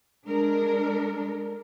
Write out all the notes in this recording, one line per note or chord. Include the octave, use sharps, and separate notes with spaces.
G#3 D4 A#4